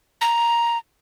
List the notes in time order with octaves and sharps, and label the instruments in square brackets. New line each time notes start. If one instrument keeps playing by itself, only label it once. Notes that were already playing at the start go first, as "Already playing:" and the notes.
[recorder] A#5